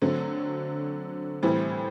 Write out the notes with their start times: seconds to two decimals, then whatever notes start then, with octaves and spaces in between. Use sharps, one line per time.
0.02 D3 F#3 A3 C4
1.43 A2 E3 G3 C4